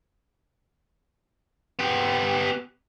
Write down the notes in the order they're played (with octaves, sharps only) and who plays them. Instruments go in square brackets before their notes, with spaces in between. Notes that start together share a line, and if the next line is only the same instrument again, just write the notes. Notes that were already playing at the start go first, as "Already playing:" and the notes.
[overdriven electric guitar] B3 G4